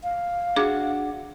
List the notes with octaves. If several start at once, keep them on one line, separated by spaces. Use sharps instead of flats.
F5
D4 F#4 G#4 D6